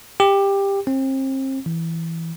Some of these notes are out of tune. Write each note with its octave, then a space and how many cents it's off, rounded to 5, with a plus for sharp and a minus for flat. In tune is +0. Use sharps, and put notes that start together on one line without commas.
G4 +15
C4 +35
E3 +0